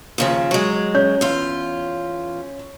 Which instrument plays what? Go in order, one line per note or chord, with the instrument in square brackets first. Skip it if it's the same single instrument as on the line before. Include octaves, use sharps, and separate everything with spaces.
[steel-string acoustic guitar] D#2 C#3 F3
F#3 G#3
[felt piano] C#4 G6
[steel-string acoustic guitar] E2 F4